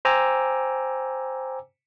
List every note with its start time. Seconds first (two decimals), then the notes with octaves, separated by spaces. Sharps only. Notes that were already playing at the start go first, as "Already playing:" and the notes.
0.05 C5 G5 G#5 A#5 D6 E6